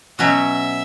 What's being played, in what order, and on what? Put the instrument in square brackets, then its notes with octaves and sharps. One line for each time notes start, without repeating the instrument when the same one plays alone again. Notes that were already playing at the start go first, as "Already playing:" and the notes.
[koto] B2 F#3 C#4 F#4 [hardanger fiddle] E5